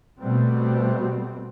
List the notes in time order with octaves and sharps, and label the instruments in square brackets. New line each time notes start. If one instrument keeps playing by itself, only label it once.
[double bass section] B2 G3 A3 C4